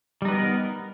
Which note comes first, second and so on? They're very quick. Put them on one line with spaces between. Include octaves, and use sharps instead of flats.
G3 D#4 B4 B3 A#4